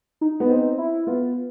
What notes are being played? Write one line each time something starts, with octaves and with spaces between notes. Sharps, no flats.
D#4
B3
C4
E4
B3 F4